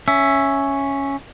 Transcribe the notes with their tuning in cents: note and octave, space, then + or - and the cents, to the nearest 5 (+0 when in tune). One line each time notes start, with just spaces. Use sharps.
C#4 +0 E5 +5